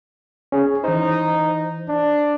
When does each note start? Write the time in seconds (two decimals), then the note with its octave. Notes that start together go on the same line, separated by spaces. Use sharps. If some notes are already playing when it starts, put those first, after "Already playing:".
0.52 C#4 G#4
0.84 E3 D#4 C5
1.89 D4